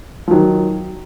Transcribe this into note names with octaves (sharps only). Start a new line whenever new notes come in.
F3
D#3 F#3